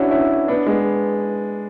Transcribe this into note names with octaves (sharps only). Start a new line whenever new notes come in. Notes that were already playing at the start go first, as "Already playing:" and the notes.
Already playing: C#4 D4 E4 F#4
C#4 E4
B3 D4
G#3 B3